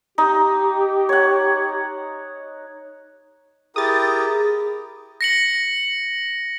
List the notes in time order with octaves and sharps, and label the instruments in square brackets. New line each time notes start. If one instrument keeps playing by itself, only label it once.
[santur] D#4 [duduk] G4
[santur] C#5 F#5
[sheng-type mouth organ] E4 G4 A#4 [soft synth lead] G#4 [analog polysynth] D#6 A6
[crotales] A#6 C#7 F#7